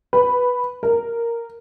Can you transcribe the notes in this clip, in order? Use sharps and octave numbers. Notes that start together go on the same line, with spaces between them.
B4
A#4